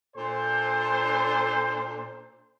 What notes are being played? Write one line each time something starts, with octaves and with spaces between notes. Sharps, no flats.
A#2 D4 A4 C5